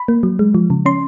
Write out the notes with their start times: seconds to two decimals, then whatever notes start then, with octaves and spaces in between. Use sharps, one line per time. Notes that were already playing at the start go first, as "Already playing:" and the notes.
Already playing: B5
0.08 A#3
0.23 F#3
0.39 G#3
0.55 F3
0.70 C#3
0.86 C#4 C6